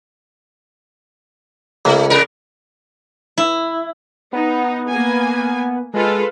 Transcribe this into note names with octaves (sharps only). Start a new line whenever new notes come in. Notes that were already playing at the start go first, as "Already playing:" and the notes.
C#2 A3
C3 A#4
E4
B3 D#4
A#3 G#5
G#3 F4 A4 B4